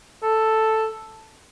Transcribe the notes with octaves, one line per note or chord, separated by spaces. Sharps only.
A4